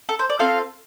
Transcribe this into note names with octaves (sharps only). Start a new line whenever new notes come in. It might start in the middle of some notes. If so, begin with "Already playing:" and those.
A4
C5
D5
C4 F4 A4 F5